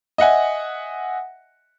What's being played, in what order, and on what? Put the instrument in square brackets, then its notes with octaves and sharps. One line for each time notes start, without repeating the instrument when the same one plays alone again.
[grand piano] D#5 E5 F#5 G#5